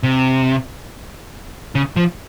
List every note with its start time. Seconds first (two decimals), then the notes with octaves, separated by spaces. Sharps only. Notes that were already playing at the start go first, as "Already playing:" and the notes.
0.03 C3
1.75 C#3
1.96 F3